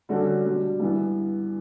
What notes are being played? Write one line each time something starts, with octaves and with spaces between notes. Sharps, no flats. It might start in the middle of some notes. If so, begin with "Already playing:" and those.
D3 G3 C#4 F#4 A4
B2 G3 D4
G2 E3 B3